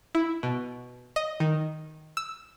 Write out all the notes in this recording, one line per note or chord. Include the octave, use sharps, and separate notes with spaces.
E4
B2
D#5
D#3
E6